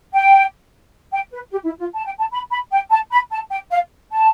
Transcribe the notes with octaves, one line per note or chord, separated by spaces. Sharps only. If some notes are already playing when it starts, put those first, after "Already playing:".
G5
G5
B4
G4
E4
F4
A5
G5
A5
B5
B5
G5
A5
B5
A5
G5
F5
A5